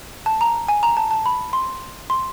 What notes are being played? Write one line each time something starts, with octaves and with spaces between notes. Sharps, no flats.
A5
A#5
G#5
A#5
A5
A5
B5
C6
C6